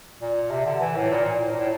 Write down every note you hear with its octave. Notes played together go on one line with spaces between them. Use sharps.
A#2
C3
D3
E3
A2
A#2
A#2
A2
A#2
A2